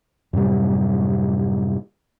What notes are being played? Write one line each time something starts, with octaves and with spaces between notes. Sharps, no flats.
F#2 A2 C3 G3